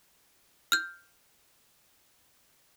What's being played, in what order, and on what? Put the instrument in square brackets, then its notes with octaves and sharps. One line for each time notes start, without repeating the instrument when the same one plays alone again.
[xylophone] F6 G6